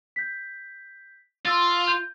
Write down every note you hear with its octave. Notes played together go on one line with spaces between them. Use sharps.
G6 B6
F4 C6 E6 A6
G6